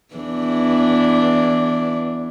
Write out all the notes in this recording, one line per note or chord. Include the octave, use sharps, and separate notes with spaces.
E2 E3 D4